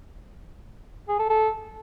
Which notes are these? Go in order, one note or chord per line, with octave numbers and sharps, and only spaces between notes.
G#4
A4
A4